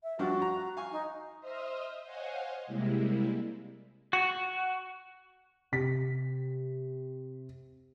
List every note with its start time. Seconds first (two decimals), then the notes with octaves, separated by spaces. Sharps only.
0.03 E5
0.19 G2 F3 D4 F#4
0.42 A#5
0.77 F5 G#5 C#6
0.91 D#4
1.40 C5 D#5 E5 C6 D#6 F6
2.02 C5 C#5 D#5 F5 F#5 G#5
2.67 C3 G3 G#3 A#3 E4
4.13 F#4
5.72 C3 B6